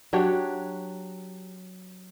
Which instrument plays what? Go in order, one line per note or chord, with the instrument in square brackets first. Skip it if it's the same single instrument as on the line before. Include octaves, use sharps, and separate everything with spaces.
[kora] F#3 D4 G4 C#5